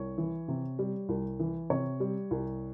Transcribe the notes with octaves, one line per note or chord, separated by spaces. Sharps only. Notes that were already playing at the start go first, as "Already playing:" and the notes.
Already playing: C2 C#5
E3
C3
G3
C2
E3
C3 C#5
G3
C2